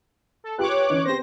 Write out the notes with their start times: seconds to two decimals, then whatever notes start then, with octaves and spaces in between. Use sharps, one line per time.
0.44 A4
0.58 F4 G4 B4 C#5 D6 F#6
0.90 E3 C#4 D#4
1.05 B3 C4 G4 C5 A#6